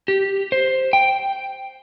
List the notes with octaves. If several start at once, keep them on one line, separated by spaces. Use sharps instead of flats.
G4
C5
G5